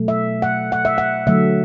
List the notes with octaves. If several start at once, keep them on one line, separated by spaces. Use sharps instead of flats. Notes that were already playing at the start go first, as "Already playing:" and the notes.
Already playing: B2 F#3 A3
E5
F#5
F#5
E5
F#5
D3 F#3 A3 E5